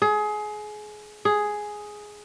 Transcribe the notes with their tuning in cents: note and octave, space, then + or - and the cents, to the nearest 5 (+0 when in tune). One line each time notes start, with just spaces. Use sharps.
G#4 +25
G#4 +5